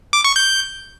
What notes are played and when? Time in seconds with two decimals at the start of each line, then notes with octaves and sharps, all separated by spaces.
0.13 D6
0.24 C#6
0.36 G6